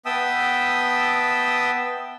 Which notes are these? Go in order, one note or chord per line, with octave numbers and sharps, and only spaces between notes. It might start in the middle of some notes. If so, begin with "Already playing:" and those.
B3 E5 G5 A5 D#6 E6